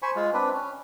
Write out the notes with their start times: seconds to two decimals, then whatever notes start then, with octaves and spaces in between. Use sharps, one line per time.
0.02 C5 G#5 B5 C#6
0.16 G#3 F4
0.33 C4 D4 B4
0.54 C#4